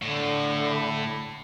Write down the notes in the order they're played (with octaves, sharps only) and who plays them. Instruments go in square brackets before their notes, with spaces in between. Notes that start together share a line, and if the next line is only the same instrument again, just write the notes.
[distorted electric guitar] A2 [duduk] D3